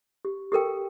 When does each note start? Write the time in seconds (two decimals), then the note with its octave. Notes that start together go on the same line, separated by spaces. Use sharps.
0.25 G4
0.52 G4 A4 A#4 G5